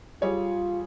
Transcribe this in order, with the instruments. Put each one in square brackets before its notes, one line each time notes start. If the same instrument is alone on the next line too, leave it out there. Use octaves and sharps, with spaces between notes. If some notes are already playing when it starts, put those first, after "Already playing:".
[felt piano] G3 G#4 C#5 [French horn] F4